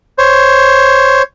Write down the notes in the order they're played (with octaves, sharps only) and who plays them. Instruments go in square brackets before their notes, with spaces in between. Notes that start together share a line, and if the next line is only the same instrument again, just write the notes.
[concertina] C5 C#5